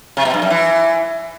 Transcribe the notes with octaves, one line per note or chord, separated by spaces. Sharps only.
C3
B2
G2
F#2
E3